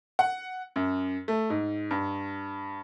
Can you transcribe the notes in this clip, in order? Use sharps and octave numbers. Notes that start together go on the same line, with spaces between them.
F#5
F#2
A3
G#2
G2